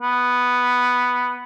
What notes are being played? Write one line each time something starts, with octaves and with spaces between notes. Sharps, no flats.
B3